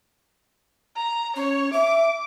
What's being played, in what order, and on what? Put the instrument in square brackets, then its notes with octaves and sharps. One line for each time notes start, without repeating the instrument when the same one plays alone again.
[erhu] A#5
[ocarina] C#4 [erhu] C#5
[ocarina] E5 [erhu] D6